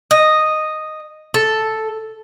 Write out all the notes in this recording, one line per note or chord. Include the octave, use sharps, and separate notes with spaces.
D#5
A4